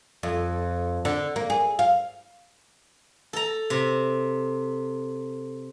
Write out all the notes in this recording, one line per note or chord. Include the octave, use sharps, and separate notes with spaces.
F2
D3
A#3
G#4
F5
A4 A#5
C3